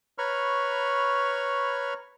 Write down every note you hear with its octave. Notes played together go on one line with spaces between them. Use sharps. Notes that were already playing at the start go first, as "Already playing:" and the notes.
B4 C#5 A#5 B5 C#6 F6